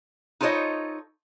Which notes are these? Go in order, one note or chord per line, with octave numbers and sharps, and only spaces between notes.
D#4 F4 A4 C5 C#5 D#5